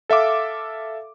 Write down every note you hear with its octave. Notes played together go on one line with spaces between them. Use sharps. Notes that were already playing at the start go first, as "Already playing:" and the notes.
A4 E5 F5 D6